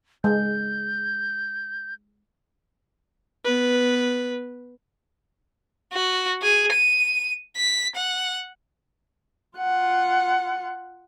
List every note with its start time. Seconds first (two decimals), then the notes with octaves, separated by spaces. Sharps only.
0.24 G#3 G6
3.45 B3 B4
5.93 F#4
6.42 G#4
6.72 D#7
7.57 B6
7.96 F#5
9.58 F4 F#5